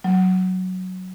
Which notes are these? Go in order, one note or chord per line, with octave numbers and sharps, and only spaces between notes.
F#3